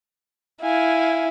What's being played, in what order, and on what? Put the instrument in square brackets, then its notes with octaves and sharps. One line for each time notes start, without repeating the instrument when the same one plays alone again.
[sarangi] E4 [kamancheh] F5 G#5